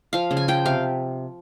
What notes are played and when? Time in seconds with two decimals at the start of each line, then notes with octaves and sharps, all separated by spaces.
0.13 F3 F5
0.31 C#3
0.37 G#5
0.48 F3 G5
0.66 C3 F5